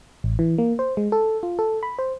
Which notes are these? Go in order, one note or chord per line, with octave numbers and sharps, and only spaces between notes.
A1
E3
A#3
C5
G#3
A4
F4
A4
B5
C5